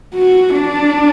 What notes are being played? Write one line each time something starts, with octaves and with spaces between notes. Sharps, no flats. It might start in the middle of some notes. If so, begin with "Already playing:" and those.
F#4
D4